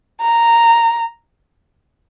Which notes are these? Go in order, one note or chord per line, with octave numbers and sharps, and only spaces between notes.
A#5